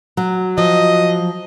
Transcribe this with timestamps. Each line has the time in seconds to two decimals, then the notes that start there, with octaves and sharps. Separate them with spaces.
0.17 F#3
0.58 F3 D#5